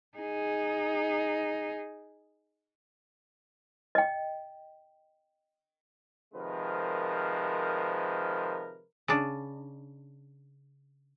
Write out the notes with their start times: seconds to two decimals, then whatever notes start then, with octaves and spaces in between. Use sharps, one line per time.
0.17 D#4 G#4
3.95 D#5 G5
6.34 C3 D#3 F3 G#3 A#4 B4
9.08 C#3 D4